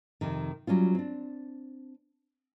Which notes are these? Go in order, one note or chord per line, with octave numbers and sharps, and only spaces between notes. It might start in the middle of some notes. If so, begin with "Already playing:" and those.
F2 C3 D#3
F#3 G3 C#4 F4
C4 D4